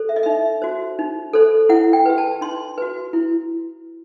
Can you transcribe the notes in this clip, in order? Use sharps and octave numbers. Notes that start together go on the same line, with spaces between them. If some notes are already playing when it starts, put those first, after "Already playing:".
Already playing: A4 C5
E5
D#5
D#4 E5
F#4 C5
D#4
A4 C5
E4 F#5
G5
G4 B4
A5
D#4 C6
F#4 B4
E4